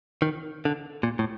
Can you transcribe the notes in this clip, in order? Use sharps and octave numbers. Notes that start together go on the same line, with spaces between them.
D#3
D3
A#2
A2